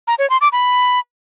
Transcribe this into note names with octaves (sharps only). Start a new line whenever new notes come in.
A#5
C#5
C6
D6
B5